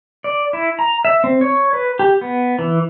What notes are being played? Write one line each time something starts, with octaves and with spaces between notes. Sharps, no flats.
D5
E4
A#5
E5
C4
C#5
B4
G4
B3
E3